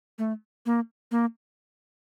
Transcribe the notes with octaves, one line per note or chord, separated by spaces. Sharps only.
A3
A#3
A#3